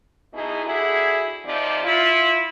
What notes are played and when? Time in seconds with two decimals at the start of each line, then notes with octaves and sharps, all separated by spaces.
0.34 B2 D#4 E4 G#4
0.64 D3 E4 F#4 G#4
1.46 C3 F3 D#4 D5
1.85 E4 F4